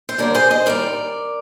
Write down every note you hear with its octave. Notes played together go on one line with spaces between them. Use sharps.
C5
D#2 D3 G3 A#4 D5
G#4 C5
C5 D#5
D#2 D#3 G3 A#4 D5